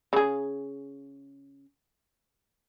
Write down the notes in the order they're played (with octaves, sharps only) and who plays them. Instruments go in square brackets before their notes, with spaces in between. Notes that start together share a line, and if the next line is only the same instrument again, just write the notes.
[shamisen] C#3 G#4